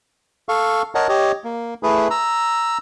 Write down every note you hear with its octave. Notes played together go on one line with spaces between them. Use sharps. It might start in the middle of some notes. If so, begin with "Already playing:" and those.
A4 F5 C#6
A#4 C#5 D#5 F#5 A5
G4 C#5 D#5
A#3
A3 E4 G#4 B4
A#5 E6